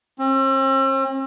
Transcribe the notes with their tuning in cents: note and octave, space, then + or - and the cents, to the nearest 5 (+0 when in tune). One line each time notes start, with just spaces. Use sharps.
C4 +45